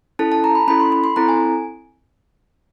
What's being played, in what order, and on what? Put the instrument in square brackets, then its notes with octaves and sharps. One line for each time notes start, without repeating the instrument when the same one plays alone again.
[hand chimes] C#4 E4 A4 A5
A5
A#5
B5
C#4 E4 A4 B5
C6
B5
C6
C4 E4 A4 A#5
G#5